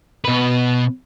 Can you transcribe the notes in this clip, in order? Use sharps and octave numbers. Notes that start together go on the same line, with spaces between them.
B2 B4